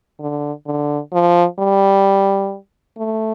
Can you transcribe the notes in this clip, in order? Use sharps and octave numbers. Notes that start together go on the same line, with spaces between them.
D3
D3
F3
G3
A3